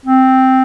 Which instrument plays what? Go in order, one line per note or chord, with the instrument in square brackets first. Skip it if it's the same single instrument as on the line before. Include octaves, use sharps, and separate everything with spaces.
[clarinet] C4